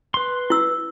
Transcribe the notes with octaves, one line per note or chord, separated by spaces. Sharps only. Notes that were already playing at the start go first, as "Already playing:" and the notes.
B4 C6
E4 E6